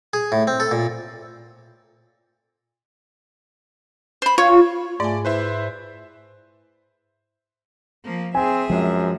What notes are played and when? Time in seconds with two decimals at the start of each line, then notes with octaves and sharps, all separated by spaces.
0.13 G#4
0.32 A2
0.47 C4
0.60 A4
0.71 A#2
4.22 C5 B5
4.38 F4 C#5 C#6
5.00 G#2 A3 D5 G#5
5.25 E4 B4 C5 E5
8.04 F3 A#3
8.35 C4 G#4 E5 G#5
8.70 F#2 F3 G#3